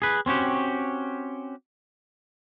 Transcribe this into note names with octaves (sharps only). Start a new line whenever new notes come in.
G#4 B4
C4 C#4 F#4 G4